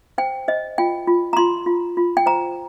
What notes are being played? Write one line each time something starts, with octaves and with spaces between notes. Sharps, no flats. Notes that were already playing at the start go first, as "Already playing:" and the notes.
C5 G5
C5 D#5
F4 G5
F4
A#5
F4 C6
F4
F4
G5
C5 A#5